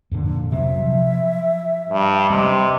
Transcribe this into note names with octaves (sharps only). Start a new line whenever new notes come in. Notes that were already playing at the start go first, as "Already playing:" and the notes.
F2 A#2 D3
C3 F#3 C4 E5
F3
G2
C3 G3 D#5